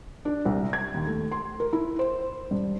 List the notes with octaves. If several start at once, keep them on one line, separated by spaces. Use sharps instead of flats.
D4
C2
G#6
D#2
A3
C6
A#4
E4
C5
G2